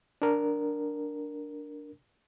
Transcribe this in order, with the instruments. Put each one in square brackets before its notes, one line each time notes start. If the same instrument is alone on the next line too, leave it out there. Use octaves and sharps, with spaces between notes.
[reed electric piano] D4 A#4